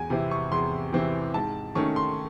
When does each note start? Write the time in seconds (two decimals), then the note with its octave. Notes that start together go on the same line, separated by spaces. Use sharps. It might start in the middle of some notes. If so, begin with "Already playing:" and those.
Already playing: E2 G#5
0.10 C3 E3 C4 E4
0.31 C#6
0.52 E2 C6
0.92 C3 E3 C4 E4
1.34 G#2 A5
1.75 D#3 A3 C#4 C#6
1.96 C6